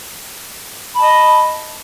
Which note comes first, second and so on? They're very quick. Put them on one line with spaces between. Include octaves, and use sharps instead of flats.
B5 A5 D#5